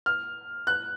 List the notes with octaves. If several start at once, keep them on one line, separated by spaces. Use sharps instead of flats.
F6
F#6